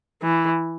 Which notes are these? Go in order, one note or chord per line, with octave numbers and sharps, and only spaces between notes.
E3